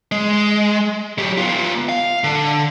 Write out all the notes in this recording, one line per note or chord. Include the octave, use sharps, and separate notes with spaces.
G#3
F#3 G4
B3 F4
F5
D3